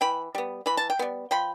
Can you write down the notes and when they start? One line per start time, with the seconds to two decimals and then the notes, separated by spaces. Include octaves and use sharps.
0.01 E3 G5 B5
0.35 G3 B3
0.66 E3 B5
0.77 A5
0.90 G5
0.99 G3 B3
1.31 F3 G5 B5